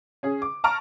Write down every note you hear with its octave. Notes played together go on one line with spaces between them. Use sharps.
C#4 G#4
D6
A5 A#5 C#6 F6 D7